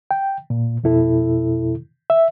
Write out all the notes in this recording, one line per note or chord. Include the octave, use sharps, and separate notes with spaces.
G5
A#2
F2 B2 E4 A4
E5